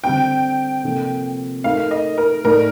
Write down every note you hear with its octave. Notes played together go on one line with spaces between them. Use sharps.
D3 G3 C4 G5
C3 F3 A#3 F4 A4
A3 D#4 A#4 F5
D#5
A#4
A2 A3 D#4 A4 A#4 D5